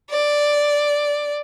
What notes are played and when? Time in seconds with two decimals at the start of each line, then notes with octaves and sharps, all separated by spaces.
0.10 D5